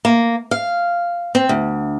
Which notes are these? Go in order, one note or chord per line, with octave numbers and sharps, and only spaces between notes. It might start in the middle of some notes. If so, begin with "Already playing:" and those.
A#3
F5
C4
D2